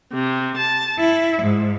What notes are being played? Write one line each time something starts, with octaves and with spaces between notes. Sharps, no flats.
C3
A5
E4
G#2